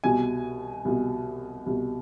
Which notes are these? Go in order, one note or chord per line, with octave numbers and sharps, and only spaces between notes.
C2 B2 G#5
C2 B2
C2 B2